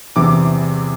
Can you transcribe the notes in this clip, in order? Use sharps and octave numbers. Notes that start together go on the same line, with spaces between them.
E2 C3 E3 D6